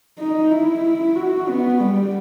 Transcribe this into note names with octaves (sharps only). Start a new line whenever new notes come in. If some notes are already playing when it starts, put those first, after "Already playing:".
D#4
E4
F#4
B3
G3